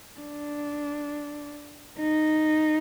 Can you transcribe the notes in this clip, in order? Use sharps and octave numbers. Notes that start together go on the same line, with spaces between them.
D4
D#4